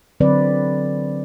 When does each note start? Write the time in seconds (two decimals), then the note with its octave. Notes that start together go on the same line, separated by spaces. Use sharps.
0.20 D3 F#3 C4 B4 D5